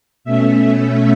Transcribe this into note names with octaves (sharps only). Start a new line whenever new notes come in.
B2 A3 C#4 E5